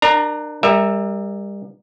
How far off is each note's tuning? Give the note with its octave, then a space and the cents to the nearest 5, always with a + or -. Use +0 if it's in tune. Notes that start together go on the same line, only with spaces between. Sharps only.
D4 +35 A#4 +0 A#5 +0
G3 +35 A#4 +0 E5 +0